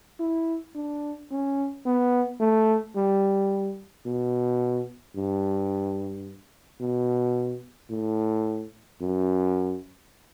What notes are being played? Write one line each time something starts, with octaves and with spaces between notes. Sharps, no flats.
E4
D4
C#4
B3
A3
G3
B2
G2
B2
A2
F#2